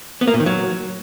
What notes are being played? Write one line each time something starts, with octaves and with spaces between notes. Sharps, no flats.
B3
A#3
A#2
D#3
F#3